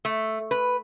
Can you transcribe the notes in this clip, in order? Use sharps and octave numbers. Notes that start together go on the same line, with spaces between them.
A3
B4